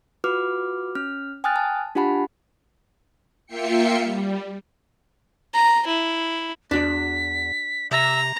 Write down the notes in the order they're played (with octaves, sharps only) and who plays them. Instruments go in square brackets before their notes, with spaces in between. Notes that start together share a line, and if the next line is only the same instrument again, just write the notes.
[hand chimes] F4 F#4 B4 D6 F6
C#4 F6
G5 G#5 D#6 F6 F#6 A6
A5
D4 F4 G4 F#5 A5 B5
[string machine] A#3 F4 E5 G5 C7 C#7
G3
[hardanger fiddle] A#5
E4
[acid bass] E2 [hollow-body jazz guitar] D4 F#4 D5 [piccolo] B6
[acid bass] C3 [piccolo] E5 [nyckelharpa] A#5